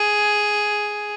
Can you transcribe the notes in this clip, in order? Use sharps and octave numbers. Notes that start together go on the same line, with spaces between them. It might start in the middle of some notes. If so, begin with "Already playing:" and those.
Already playing: G#4